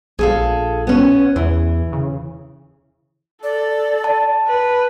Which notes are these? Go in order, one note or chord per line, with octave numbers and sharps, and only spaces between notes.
A#1 G#4 A4 F5
B3 C#4
E2 E3
C#3
A4 D5
A5
B4